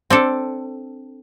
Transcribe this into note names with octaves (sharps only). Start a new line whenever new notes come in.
C4 D4 A4